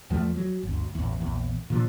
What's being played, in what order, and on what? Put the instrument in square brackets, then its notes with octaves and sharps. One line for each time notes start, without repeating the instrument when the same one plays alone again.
[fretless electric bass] E2 F3 A3
F#3
G1 D2
A1 E2
A#1 E2
A#2 D3 F3